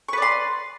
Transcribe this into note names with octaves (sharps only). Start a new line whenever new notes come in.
B4 D5 C6 C#6